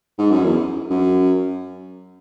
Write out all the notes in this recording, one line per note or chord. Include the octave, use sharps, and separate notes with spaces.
G#2
F#2
E2
F#2